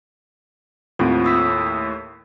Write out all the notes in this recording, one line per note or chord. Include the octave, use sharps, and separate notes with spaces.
D#2 A2 C4 F4
D#6 E6 B6